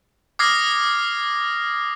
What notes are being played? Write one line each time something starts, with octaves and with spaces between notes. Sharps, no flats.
D6 D#6 F6 G#6 A#6 C7